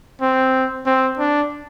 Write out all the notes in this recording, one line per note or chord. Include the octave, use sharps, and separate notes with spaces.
C4
C4
D4